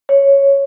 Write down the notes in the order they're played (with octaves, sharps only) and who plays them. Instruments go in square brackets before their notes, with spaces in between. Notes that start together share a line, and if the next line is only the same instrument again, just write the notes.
[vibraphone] C#5